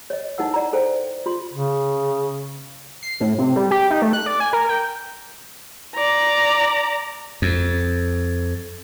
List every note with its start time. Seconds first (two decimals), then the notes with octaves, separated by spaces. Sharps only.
0.10 C#5 D#5
0.38 D#4 E4 A#4 F#5 E6
0.54 D5 F#5 A#5
0.73 A4 C5 G5
1.26 F4 C6
1.53 C#3
3.02 C7
3.20 A2
3.38 C3
3.56 G3
3.71 G4
3.91 D#4
4.02 A3
4.13 F#6
4.26 D5
4.40 G#5
4.53 A#4
4.69 G5
5.95 D5 A#5
7.42 F2